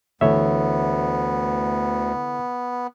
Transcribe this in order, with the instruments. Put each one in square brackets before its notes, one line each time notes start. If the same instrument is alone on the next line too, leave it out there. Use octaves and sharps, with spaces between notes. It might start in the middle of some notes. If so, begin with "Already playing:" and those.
[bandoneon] D2 [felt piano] D3 E3 [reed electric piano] A3 C#5 E5 [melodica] B3